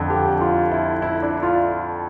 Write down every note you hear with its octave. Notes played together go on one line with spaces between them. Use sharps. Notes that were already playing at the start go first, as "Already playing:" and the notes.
Already playing: F2 D3
G4
F4
E4
E4
D4
F4